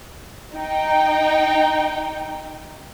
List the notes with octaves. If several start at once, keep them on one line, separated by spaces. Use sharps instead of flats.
D#4 G5